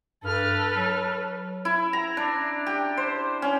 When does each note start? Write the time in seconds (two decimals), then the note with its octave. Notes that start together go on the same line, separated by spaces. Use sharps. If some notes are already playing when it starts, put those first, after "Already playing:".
0.24 G2 A4 B4 F6
0.76 F#3
1.65 E4
1.93 A#5
2.17 D4
2.67 G4
2.97 C5
3.42 C#4